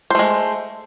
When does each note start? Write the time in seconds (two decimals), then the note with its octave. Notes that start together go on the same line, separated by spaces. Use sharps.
0.10 C5
0.15 A3
0.19 G#3